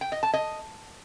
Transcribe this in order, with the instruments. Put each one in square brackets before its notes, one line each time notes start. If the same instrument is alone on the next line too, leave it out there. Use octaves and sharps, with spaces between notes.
[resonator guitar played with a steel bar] G5
D#5
A5
D#5